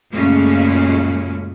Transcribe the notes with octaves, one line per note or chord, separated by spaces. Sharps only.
F#2 A#2 C#3 G#3 A3 C#4